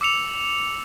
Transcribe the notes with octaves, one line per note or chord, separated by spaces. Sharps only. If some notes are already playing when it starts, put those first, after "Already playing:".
D6 E6 C#7 F7